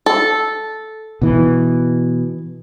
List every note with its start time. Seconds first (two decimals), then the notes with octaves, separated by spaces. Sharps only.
0.06 A4
1.22 B2 E3